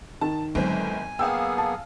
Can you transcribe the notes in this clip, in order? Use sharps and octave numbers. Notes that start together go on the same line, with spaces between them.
D#3 A5
G1 G#2 F#3 C4 G#5
A#3 B3 G#4 F5 G5 G#5 E6
A5